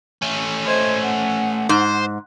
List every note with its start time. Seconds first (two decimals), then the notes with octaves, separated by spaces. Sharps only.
0.22 A3 C#4
0.65 C5 D#5 G#6
1.01 F#5
1.69 G#2 C5